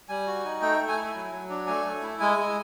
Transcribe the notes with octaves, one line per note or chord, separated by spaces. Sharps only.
G3 G#5
F#4
D#4
A3 G5
A3
G#5
E4
F#3
F#3
D4
A3 G#5
A3
E4
G#3 G#5
G#3